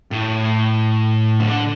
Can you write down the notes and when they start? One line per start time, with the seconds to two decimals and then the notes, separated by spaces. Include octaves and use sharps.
0.11 A2
1.40 D3